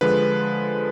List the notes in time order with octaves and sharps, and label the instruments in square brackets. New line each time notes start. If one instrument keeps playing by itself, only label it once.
[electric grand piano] D3 F3 G#3 B4